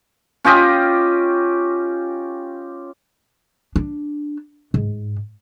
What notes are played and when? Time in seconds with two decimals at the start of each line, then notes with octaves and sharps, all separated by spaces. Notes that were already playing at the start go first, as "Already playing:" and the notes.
0.44 C#4 F4 G4 D#5
3.76 D4
4.74 G#2